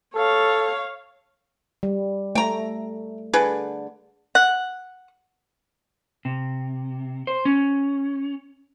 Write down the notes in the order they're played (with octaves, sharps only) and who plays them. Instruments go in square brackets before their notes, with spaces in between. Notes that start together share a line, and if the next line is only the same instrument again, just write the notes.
[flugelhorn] A4 [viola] C#5 F5
[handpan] G3
[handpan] A3 [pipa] G5 A#5
[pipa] D3 G#4 B4
F#5
[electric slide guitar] C3
C5
C#4